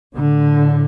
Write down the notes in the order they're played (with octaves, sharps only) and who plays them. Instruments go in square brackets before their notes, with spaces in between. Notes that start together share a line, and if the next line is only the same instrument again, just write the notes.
[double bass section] A2 D3